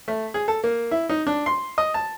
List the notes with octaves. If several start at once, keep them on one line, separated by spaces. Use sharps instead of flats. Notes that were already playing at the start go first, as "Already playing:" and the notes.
A3
G#4
A4
A#3
E4
D#4
D4
C6
D#5
A5